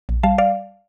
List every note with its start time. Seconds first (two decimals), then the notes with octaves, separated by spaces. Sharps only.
0.09 A#1
0.23 G3 F5 A5
0.38 D5 F5